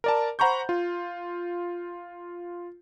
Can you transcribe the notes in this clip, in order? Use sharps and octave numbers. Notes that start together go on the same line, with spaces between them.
A#4 D5 A5
C5 F#5 A#5 B5 C#6 G6
F4